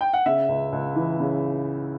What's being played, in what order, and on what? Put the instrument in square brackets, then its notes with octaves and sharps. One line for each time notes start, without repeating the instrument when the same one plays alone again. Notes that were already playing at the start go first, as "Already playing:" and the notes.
[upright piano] G5
F#5
C#3 E5
C#2
C#2
E3
C#3